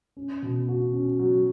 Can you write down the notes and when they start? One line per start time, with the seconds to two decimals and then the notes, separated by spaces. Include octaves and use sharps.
0.17 C#4
0.42 B2
0.68 F#4
0.94 C#4
1.19 F#3